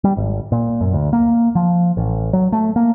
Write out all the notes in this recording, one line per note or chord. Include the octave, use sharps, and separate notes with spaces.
G3
G#1
A#2
F#2
D2
A#3
F3
A1
F#3
A3
A#3